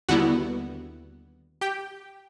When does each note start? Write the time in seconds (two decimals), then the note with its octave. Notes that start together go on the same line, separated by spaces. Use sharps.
0.09 D#2 D3 G3 B3 E4 F#4 F#5
1.61 G4 G5